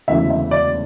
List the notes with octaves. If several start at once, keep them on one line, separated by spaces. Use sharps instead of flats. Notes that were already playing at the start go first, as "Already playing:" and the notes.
E1 D2 C#3 E3 E5
E5
D5